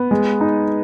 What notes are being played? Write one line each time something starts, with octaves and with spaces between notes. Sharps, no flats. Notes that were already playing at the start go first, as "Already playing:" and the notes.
Already playing: B3
G#3
D#4